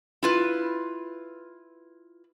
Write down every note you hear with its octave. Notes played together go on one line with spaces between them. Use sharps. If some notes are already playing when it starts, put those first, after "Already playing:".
E4 F4 B4